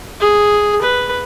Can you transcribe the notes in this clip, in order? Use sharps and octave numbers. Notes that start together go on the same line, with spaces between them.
G#4
B4